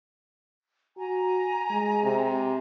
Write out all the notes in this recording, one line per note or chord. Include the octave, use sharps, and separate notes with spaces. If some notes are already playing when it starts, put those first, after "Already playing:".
F#4 G#5 A#5
G#3
C3